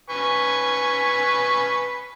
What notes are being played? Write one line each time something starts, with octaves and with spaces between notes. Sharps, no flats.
B4 G#5 C#6